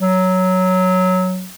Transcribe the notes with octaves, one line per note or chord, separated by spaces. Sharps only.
F#3